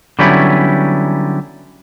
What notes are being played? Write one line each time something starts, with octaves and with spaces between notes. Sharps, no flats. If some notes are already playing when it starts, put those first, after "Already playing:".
D3 F#3 G3 B3 C#4 E4